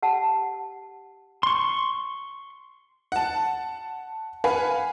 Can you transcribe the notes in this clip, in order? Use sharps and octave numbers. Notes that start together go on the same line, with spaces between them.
G4 F#5 A5
C6 C#6
F#5 A5
B4 F5 F#5 G#5